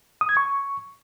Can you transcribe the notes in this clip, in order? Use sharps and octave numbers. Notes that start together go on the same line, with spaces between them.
D#6
G#6
C#6